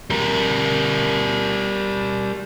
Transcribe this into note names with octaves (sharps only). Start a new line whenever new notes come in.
G3 A#4